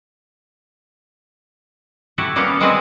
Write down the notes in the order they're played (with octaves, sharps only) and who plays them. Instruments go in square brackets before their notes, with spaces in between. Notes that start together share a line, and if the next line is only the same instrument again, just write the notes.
[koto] A3 E4 F#4 G4
G3 A#3 B3 C#4 F5
G#3 C4 F4 F#4 B4 G#5